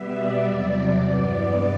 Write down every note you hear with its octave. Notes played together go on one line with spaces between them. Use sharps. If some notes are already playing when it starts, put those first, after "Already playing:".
Already playing: B2 G3 B3 E5
D5
E2 C3 F#3
G2 E3 B3